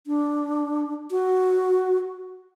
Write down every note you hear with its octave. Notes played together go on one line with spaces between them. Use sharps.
D4
F#4